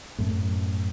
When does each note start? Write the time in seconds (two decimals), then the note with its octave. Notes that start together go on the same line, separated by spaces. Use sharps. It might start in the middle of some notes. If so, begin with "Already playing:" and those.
0.18 F#2 A2